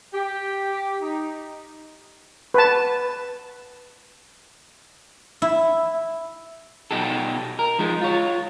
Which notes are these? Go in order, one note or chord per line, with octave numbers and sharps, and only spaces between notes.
G4
D#4
B4 A5
E4
B2 D#4 G4 A4
A#4
F3 G#3 D#4
F4 C#5